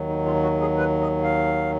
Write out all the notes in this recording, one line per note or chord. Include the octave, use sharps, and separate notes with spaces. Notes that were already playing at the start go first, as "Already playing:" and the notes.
Already playing: D#2 D#3 F#3
D#4
F4
F#4
G#4
B4
D#5
F5